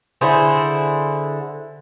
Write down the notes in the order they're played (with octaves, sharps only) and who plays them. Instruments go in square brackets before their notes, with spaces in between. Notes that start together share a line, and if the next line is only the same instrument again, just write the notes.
[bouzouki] D3 E4 G#4 C5